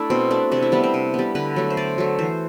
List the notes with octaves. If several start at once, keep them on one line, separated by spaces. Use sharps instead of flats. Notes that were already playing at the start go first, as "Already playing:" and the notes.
Already playing: A3 D4 E4 A4
B2 C4
A3 D4
C3 D4
E4
G3 B3 D4
C4
C3
G3 B3
D3 B4
F#3 A3
C5
D3 D5
F#3 A3
E3 C5